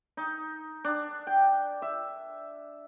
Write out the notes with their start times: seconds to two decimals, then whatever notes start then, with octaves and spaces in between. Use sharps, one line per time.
0.17 D#4
0.85 D4
1.27 G5
1.82 E5